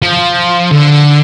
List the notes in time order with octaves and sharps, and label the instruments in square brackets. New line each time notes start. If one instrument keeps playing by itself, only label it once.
[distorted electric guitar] F3
D3